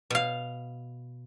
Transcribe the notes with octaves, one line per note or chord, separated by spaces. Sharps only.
B2 F5